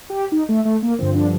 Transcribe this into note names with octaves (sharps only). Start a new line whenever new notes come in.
G4
D#4
A3
A3
A#3
G2 D3 F3 C4
D4